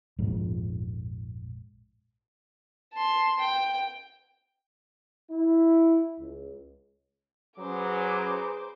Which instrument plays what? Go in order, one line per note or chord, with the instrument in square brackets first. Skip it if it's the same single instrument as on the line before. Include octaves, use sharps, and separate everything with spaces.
[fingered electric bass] A#1 F2 G#2
[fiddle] A5 C6
G5
[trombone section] E4
C#2
[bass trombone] F#3 [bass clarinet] C#4 [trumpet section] G#4 B4 A#5 [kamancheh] C5 D6